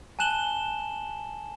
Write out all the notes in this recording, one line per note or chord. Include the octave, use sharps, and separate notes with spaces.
G#5 A5 F#6 E7 F#7 G7